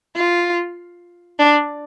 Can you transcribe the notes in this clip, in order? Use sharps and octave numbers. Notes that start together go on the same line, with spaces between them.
F4
D4